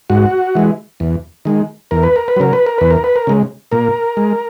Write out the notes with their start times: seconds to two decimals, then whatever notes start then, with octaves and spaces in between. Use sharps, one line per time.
0.10 G#2 F#4
0.55 E3 G#3
1.00 E2
1.45 D#3 G#3
1.91 E2 A#4
2.03 B4
2.16 A#4
2.28 B4
2.36 C#3 F#3 A#4
2.53 B4
2.66 A#4
2.78 E2 B4
2.91 A#4
3.04 B4
3.16 A#4
3.27 C#3 G#3
3.72 A#2 A#4
4.17 G#3